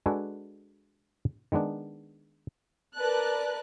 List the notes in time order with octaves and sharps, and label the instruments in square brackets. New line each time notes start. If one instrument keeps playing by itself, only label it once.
[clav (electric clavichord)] G#3 D4 F#4 A4 B4 G#5
D#3 G#3 B3 D4
[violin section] A#4 B4 D5 A5 F#6